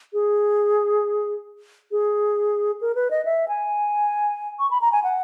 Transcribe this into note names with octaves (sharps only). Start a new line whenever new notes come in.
G#4
G#4
A#4
B4
D#5
E5
G#5
C#6
B5
A#5
G#5
F#5